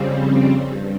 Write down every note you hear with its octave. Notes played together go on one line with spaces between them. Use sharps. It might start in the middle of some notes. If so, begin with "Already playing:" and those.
Already playing: F2 C#3 G3 C4
G2